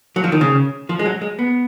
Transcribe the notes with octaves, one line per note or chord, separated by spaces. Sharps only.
F#3
F3
D#3
C#3
F3
G#3
F#3
G#3
B3